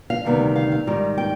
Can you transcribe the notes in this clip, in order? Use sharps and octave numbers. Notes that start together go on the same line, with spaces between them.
F5
D2 C3 D#3 G3 B3
F5
F5
G#2 D#3 G3
G5